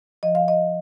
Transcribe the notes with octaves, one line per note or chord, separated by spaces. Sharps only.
F3 D#5
F5
D#5